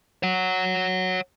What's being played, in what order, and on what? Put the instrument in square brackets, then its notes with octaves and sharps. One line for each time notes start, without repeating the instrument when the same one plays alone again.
[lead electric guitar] C#5 F#5